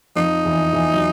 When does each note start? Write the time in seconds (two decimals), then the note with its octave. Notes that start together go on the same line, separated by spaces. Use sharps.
0.16 F2 F3 D#4
0.45 E2 E3
0.73 E2 E3
0.94 F#3